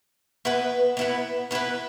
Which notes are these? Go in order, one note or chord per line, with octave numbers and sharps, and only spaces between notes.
B3 E4 B4
B3 E4 B4
B3 E4 B4